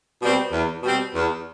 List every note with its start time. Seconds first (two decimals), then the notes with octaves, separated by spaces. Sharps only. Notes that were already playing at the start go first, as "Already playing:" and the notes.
0.21 B2 G3 C4
0.52 E2
0.83 B2 G3 C4
1.14 E2